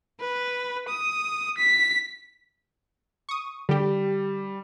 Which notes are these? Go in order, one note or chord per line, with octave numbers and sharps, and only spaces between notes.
B4
D#6
B6
C#6 D#6
D3 G3 G4